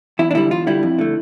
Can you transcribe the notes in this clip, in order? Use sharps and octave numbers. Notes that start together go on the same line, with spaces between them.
E2 E4
D4
D3 G3 E4
E2 F4
D3 G3 E4
F2
D3 A3